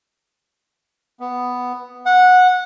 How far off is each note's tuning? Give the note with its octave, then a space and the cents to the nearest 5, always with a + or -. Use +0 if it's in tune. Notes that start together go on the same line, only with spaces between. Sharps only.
B3 +5
F#5 -15